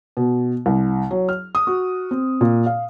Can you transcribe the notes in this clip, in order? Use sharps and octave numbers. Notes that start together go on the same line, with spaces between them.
B2
C2
F#3
F6
D#6
F#4
C4
A#2
F5